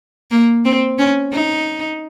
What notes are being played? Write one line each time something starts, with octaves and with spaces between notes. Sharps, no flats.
A#3
C4
C#4
D#4